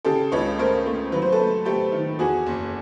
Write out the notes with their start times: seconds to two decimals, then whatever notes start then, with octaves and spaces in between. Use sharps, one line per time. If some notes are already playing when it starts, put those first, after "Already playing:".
0.05 C#3 G4 A4
0.32 C#2 B4 C#5
0.58 A3 A#4 C5
0.86 A3
1.12 F#3 B4
1.22 C5
1.32 A4 B4
1.40 A3
1.65 A3 G4 A4
1.92 D#3
2.19 E2 F#4 G#4
2.46 F#1